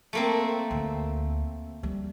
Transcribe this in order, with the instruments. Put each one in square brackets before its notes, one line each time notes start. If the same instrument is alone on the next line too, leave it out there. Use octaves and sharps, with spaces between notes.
[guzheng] A3 A#3 C4
[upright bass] D2
F3 G3